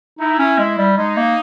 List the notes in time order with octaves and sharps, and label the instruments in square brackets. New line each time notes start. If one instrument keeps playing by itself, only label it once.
[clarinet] D#4 [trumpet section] E4
[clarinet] C#4
G#3
G3
[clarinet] G#3 [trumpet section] D#4
[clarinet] A#3